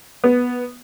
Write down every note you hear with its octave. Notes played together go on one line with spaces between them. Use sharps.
B3